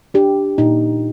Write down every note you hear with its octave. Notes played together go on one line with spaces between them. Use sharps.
D4 G4
A#2 D#4